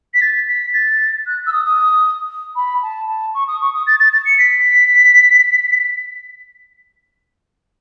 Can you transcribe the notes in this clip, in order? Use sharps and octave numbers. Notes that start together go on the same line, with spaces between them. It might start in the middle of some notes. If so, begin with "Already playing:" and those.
B6
A6
B6
A6
F#6
E6
D#6
D#6
B5
A5
A5
C#6
D#6
C#6
D#6
A6
A6
A6
C#7
B6